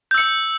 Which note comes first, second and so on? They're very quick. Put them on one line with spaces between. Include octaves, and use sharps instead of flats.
G6 E6 C#7